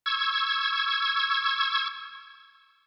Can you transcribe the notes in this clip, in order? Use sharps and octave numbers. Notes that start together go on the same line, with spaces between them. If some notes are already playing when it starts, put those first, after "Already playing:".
C#6 E6 G#6